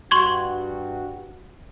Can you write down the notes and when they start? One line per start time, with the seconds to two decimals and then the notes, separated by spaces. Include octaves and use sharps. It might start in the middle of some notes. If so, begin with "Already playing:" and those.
0.11 G2 F#4 C6 C#6 G#6